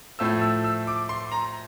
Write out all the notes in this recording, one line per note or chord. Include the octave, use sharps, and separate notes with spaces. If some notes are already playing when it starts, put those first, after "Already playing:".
A2 F3 A3 E6
E6
E6
D6
C6
A#5